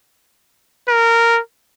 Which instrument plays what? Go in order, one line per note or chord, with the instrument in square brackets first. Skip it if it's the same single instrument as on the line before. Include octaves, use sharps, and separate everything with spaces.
[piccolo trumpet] A#4